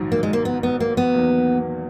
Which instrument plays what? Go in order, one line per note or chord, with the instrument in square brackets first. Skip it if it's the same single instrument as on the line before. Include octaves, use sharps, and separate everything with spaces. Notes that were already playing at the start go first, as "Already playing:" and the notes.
Already playing: [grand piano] A#1 G#2 D#3 F#3
[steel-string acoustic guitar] A#3
G#3
A#3
B3
B3
A#3
B3
[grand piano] E2 D#3 F#3 A#3